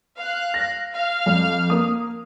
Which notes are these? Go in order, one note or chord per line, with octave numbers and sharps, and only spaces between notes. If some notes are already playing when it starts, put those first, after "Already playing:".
F5 F#6
A#6
F5 F6
F2
A#3 D#6